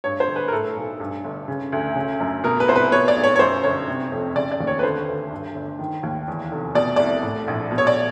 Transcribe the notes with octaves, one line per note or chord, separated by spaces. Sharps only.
G2 C#5
C5
G1
B4
A#4
A2 A4
B1
G2
G1
C#3
D2
C#3
F#2
B2 A#4
B4
C2 C5
B4
B2 C#5
D5
B1
C#5
C#5
F#2 C5
G1 C#5
C3
F2
C#3 D5
D5
D#2
C#5
B4
D3 C5
D2
G2
G1
D#3
D#2
E2
F1
B2 D5
C2 D5
A2
A#1
B2
C#5
D5